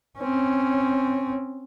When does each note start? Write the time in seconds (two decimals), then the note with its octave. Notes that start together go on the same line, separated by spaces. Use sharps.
0.19 C4 C#4